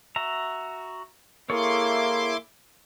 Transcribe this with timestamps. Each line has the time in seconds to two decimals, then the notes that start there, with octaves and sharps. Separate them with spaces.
0.16 F#4 E5 A#5
1.50 A#3 E4 G#4 A4 C#5 C6 D6